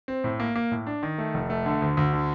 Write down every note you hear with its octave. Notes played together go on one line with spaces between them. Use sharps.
C4
A2
A#3
A#3
A2
D4
D#3
A3
F1
A3
D3
D2
D2
D3